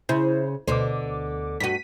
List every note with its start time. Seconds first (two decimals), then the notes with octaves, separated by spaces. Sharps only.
0.09 C#3 E4 C5
0.68 D2 B2 D3 C5 D6
1.60 G2 F#4 B6 D#7